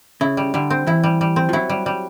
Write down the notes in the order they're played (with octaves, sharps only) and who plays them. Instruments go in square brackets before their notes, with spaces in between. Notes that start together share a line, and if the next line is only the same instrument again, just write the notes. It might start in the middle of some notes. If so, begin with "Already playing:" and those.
[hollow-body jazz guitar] C#3 [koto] E4
[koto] G3
[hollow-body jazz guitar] D3 [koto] G3
[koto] C4
[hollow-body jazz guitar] E3 [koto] E4
[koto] G3
G3
C4
[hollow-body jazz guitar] F3
[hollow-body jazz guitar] F#3 [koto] E4
[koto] G3
G3